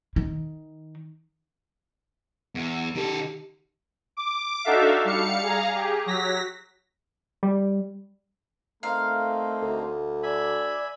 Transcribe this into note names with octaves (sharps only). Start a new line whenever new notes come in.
D#3
E2
D#3 G4 A4
D6
D4 D#4 F#4 A4 E5 F5
G3 F5 C#7
G#4 F5 A#5
G4 G#4
F#3 A#6 B6
G3
A3 A#3 C4 D#4 F5
D2
D5 E5 G#5 B5